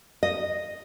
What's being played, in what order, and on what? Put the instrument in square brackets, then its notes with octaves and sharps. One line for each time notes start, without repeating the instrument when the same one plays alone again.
[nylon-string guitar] D#5